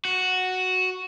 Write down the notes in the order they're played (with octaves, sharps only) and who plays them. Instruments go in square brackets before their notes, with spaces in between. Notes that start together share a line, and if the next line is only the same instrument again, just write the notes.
[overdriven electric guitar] F#4